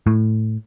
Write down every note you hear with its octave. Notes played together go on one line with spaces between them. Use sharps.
A2